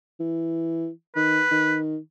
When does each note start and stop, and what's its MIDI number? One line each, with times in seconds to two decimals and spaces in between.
0.20 0.89 52
1.16 1.41 51
1.16 1.77 71
1.51 1.97 51